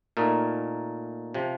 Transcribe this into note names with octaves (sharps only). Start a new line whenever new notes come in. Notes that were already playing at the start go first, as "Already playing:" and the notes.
A#2 A3 D#4 A#4
C3 F3